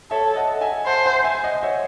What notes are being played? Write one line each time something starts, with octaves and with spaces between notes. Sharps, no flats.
A4 C#5 E5
D#5 F#5
E5 G#5
C5 F#5 A5
E5 G#5
E5 G#5
D#5 F#5
C#5 E5